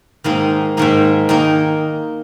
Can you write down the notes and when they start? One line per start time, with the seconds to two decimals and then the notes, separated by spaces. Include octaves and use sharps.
0.24 G#2 D#3 A#3 D#4
0.77 G#2 D#3 A#3 D#4
1.29 D#3 A#3 D#4